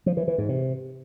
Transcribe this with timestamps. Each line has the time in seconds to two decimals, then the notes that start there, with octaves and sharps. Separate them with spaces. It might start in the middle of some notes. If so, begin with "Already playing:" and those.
0.06 F3
0.17 E3
0.28 E3
0.38 G#2
0.49 C3